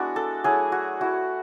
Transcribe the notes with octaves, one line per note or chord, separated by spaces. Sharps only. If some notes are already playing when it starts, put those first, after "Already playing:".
Already playing: G#3 B3 D4 E4 F#4
A4
F#3 A3 E4 G#4
F#4
A3 E4 F#4